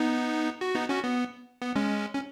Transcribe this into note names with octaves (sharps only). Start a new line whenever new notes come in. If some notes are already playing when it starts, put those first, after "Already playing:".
Already playing: B3 D#4
F#4
B3 D#4
C#4 F#4
B3
B3
G#3 C#4
C#4